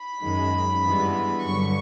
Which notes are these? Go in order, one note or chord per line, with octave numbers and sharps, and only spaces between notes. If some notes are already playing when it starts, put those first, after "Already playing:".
Already playing: B5
F#2 D#3 G#3
G2 E3 G#3 B3
G2 D3 F#3 C#6